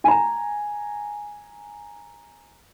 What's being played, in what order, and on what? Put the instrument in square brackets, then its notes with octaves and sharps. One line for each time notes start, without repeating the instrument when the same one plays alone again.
[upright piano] G#5 A#5